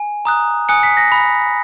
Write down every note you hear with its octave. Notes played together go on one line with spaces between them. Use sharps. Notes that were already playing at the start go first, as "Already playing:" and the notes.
Already playing: G#5
A#5 D#6 F#6
G#5 D#6 F#6 C#7
B6
A#6
B5